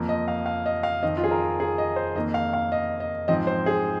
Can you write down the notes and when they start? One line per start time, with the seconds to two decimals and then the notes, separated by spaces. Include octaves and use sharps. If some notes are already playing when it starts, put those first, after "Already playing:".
Already playing: F2 F3 A#3
0.09 D#5
0.28 F5
0.46 F5
0.66 D#5
0.83 F5
1.03 F2 D#3 C4 D#5
1.17 F4
1.24 G#4
1.31 A#4
1.60 G#4
1.78 D#5
1.96 C5
2.15 F2 D#3 A#3 D#5
2.34 F5
2.53 F5
2.72 D#5
3.00 D#5
3.28 G#2 F3 C4 D#5
3.47 C5
3.66 G#4